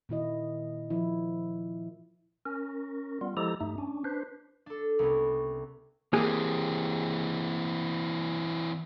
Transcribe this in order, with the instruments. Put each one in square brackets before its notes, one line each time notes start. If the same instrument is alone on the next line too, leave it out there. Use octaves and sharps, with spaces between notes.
[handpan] A#2 D#3 E4 D#5
F3 E4
[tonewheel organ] C#4 A#4
G3 B3 F4
F3 G#3 E4 G4 A4 A#5
G2 A3 D#4
C#4 D4
D4 B4 C5
[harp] D4 A4
C2 B3 C#4
[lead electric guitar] E3 C4 [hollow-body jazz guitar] A#3 G4 G#4